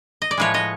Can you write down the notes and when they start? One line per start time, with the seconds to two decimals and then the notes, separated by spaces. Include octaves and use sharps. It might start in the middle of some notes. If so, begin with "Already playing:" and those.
0.22 D#5
0.31 D5
0.37 A2 F3 G#3 B4 C#5
0.54 C#5 D#5